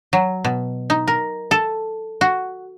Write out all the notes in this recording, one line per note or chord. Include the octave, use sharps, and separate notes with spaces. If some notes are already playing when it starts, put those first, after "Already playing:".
F#3
B2
D#4
A#4
A4
F#4